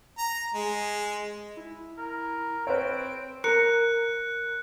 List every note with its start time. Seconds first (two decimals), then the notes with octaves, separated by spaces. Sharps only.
0.18 A#5
0.54 G#3
1.57 E4
1.98 A#4
2.67 C4 B4 C#5 D7
3.44 A#4 F#6 C#7